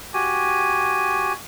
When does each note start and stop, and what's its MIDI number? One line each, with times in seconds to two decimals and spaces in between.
0.14 1.33 66
0.14 1.33 67
0.14 1.33 80